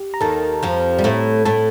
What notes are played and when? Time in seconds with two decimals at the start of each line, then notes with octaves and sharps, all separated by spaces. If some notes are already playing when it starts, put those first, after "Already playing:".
Already playing: G4
0.14 A#5
0.21 D#2 D#3 A4 A5
0.63 F2 F3
0.98 G3
1.04 A2 A3
1.45 A2 A3 A4 A5